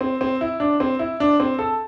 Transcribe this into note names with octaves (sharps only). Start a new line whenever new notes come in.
C4
C4
E4
D4
C4
E4
D4
C4
A4